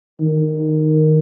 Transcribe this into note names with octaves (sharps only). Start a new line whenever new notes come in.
D#3